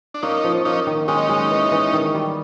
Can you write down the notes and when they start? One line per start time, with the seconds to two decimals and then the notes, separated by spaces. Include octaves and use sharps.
0.14 D4
0.23 A#3 C#4 D#4
0.44 F3
0.65 A#3 C#4 D#4
0.87 D#3
1.08 G#3 C#4 D#4
1.29 G#3
1.51 E3
1.71 E3
1.93 D#3
2.15 G3